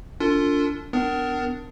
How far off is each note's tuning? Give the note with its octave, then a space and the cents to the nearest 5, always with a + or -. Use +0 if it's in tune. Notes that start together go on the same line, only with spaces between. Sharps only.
D4 -35 F4 +0 A4 +40
B3 +35 D4 +10 A#4 +0